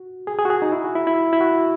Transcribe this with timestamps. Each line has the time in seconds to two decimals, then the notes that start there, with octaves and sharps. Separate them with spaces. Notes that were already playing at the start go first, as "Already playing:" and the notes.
Already playing: F#4
0.27 G#4
0.39 G#4
0.45 F#4
0.50 G#4
0.62 D#4
0.72 E4
0.84 F#4
0.95 E4
1.07 E4
1.33 E4
1.41 F#4